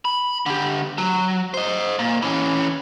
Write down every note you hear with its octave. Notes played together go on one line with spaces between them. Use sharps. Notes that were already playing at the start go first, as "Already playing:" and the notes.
B5
D3 G4
F#3
C5 D#5
A#2
E3 C#4